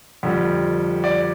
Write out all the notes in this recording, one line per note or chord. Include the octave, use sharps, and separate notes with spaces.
F2 D3 G3
D5